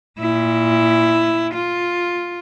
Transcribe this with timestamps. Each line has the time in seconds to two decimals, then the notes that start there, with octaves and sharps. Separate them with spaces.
0.19 A#2 E4
1.53 F4